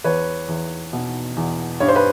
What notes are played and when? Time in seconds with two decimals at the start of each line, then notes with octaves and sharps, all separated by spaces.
0.04 E2 B4 C#5
0.48 E2
0.93 B2
1.37 E2
1.80 G2 C#5
1.88 C5
1.96 B4